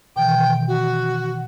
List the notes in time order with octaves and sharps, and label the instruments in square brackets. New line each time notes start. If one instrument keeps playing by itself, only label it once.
[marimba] B2 D#3 E3 [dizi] G5
[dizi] F#4